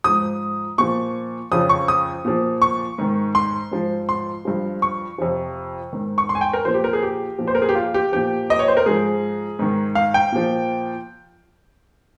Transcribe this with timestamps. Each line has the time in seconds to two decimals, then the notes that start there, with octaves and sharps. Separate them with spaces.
0.04 G#2 F3 D#6
0.78 A#2 F3 C#6
1.52 F2 C#3 F3 D#6
1.69 C#6
1.88 D#6
2.25 A#2 F3
2.62 C#6
2.98 G#2 D#3
3.35 C6
3.72 G#2 F3
4.09 C6
4.45 G2 F3
4.82 C#6
5.18 F2 C3 F3
5.93 G#2 D#3
6.18 C#6
6.29 C6
6.35 G#5
6.41 G5
6.53 A#4
6.65 A#2 F3 C5
6.74 G4
6.84 A#4
6.93 G#4
7.03 G4
7.39 A#2 F3
7.47 C5
7.55 A#4
7.62 G#4
7.69 G4
7.75 F4
7.94 G4
8.12 A#2 F3 G4
8.50 D#5
8.59 C#5
8.68 C5
8.77 A#4
8.86 G#2 F3 G#4
9.59 G#2 D#3
9.95 F5
10.14 G5
10.32 A#2 F3